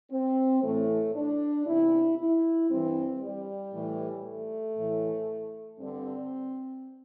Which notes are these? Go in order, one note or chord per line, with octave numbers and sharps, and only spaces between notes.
C4
A2 E3 A3
D4
E2 C3 E3 E4
E4
G2 E3 C4
G3
A2 E3
A3
A2 E3
G2 D3 C4